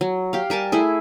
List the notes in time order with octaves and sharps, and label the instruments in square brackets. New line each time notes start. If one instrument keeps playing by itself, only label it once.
[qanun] F#3
G4 F5
G3 A#4 G#5 A5
A3 E4 G#4